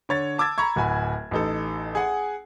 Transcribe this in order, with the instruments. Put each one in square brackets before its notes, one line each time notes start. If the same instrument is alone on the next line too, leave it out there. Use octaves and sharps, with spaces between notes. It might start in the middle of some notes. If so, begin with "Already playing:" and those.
[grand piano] D3 C#5 A6
A5 D6 E6 G#6 A6
A#5 B5 C#6 G#6
D1 F#4 G#5 B5
A1 D#4 A4
G#4 F#5 G#5